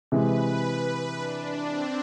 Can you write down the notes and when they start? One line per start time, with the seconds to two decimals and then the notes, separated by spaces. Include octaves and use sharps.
0.11 C3 E3 G#3 B4
1.15 D4
1.67 C4